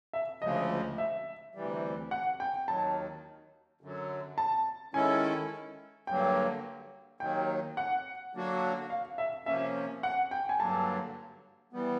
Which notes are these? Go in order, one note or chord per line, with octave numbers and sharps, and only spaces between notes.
E5
D2 C#3 F3 G#3 D#5
E5
D2 C3 E3 G3
F#5
G5
D#2 D#3 F#3 A5
F#2 D3 F#3
A5
D#3 G#3 C#4 E4 A4 G#5
G2 D3 F#3 A#3 G5
D#2 D#3 F#3 G5
F#5
D3 F#3 A#3 D4 F#4
F5
E5
C3 F3 A#3 C#4 E5
F#5
G5
G#5
G2 D3 F#3 A#3 A5
E3 G3 B3